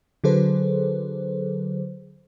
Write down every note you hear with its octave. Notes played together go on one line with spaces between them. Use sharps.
D3 F#3 G#4 A4 B4 C5